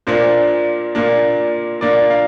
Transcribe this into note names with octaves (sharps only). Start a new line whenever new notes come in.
A#2 A#3 D4 C5
A#2 A#3 D4
A#2 A#3 D4 D5
F5